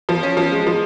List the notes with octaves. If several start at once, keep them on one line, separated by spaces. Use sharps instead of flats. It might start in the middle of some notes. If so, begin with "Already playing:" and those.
F3
C#4
F3
G#3
F3